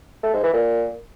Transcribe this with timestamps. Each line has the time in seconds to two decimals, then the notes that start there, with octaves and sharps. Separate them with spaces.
0.23 A3
0.33 G#2
0.43 E3
0.53 A#2